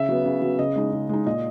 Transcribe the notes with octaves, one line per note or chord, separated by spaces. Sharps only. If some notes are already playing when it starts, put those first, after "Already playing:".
Already playing: C#3 E5
F#3 B3
C#3
F#3 B3
C#3 D#5
G#3 D#4
C#3
G#3 D#4
A#2 D#5